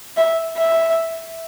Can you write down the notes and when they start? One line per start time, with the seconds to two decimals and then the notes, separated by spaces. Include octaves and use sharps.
0.17 E5
0.57 E5